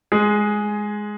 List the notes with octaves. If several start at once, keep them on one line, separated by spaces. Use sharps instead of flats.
G#3 G#4